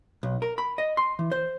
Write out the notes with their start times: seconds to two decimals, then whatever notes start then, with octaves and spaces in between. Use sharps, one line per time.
0.23 B1
0.42 A#4
0.58 B5
0.78 D#5
0.97 C6
1.19 E3
1.32 C5